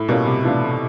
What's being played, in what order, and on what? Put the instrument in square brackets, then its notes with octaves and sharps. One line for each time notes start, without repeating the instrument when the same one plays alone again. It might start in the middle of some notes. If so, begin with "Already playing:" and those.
Already playing: [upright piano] A2
[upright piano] B2 [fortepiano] G3 A#3 C#4 F4
[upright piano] C3
[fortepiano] E3 A3 D4 F4